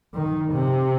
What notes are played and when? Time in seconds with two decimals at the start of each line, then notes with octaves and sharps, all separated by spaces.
0.14 D#3
0.52 C3